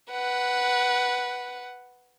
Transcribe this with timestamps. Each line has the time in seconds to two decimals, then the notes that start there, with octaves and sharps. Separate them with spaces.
0.11 B4 F#5